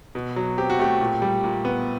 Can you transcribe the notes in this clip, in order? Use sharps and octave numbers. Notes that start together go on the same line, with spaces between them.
B2
F#3
C4 G4
F#4
A3 G4
A#2
G3
A#2
B3